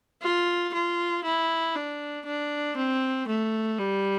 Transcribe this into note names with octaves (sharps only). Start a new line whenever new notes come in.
F4
F4
E4
D4
D4
C4
A3
G3